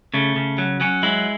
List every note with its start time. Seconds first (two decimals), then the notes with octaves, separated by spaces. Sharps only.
0.14 C#3 A3
0.36 C#3
0.58 F#3
0.81 F#3 C#4
1.03 G#3 E4